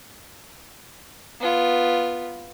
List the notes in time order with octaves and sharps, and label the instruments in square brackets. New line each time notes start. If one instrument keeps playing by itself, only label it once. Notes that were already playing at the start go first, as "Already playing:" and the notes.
[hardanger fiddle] B3 F4